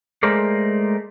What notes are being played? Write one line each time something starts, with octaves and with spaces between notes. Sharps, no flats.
G#3 A3 A#4 C5 D5